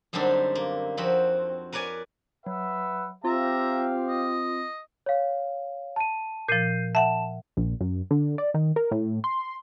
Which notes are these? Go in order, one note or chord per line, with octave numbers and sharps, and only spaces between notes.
F#2 D3 G3 C4 D4 D#4
A#3
F2 C4 F#4 B5
A#4 B4 C#5 D5 G#5
F#3 B4 E5 F#5
C4 F4 G4 E5 F5 A#5
D#5
C#5 F5
A5 D#7
A#2 F3 G6 C7 D#7
E5 F#5 A5 E7
A#1
F#2
D3
D5
D#3
A#4
A2
C6